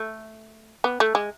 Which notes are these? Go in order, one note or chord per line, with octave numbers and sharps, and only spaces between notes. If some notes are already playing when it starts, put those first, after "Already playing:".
Already playing: A3
B3
A3
G#3